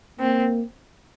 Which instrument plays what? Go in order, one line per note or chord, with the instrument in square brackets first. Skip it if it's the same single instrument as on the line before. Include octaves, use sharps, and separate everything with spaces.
[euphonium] A#3 [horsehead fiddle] C4